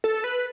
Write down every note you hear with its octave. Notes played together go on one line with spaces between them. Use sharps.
A4
B4